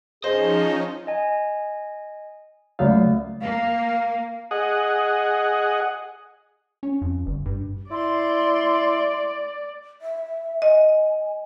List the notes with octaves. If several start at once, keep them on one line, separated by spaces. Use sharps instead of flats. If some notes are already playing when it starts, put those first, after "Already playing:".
F3 C#4 D#4 G#4 C5 D#5
D#5 G#5
C#2 F#3 A3 A#3 D5 F5
A#3 F5
G#4 D#5 F#5
C#4
F2
G1
G2
E4 D5 C6
E5
D#5 G#5